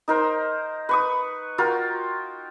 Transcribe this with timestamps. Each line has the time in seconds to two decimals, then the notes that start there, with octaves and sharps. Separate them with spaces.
0.08 D#4 A#4 C5
0.89 B4 C#6 D#6
1.58 F4 F#4 A#4 G5